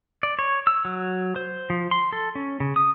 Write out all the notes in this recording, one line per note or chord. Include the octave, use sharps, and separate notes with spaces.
D5
C#5
E6
F#3
C5
F3
C6
A4
C#4
C#3
D#6